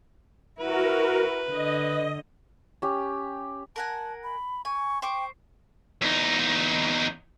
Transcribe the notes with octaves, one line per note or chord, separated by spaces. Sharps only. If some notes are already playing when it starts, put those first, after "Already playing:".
E4 F#4 A#4 B4
D3 D#5
C#4 G4
A#4 F#5 G#5 A5
B5
G#5 C#6
C5 G5 C#6 D6
E2 D#4